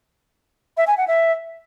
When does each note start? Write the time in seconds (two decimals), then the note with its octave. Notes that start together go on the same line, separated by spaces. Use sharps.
0.77 E5
0.87 G#5
0.97 F#5
1.07 E5